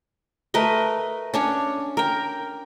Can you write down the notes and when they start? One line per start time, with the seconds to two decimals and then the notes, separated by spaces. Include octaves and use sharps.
0.54 A3 A#4 B4 D#5
1.34 C#4 D4 C#5
1.97 A#4 G5